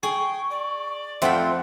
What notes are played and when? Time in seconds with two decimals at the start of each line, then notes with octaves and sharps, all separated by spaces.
0.03 G#4 G5 C#6
0.50 D5
1.22 F2 A3 C4 F4 C5 F#5 B5